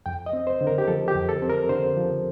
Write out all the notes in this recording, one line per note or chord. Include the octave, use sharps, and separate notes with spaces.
F2 G5
D#5
C4
C5
D3
A#4
G4
F3 A4
G4
F2
A4
C4
A#4
D3 C5
F3